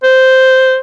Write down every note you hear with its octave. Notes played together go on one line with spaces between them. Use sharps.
C5